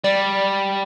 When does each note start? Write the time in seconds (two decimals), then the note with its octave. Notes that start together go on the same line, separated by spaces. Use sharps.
0.04 G3 D5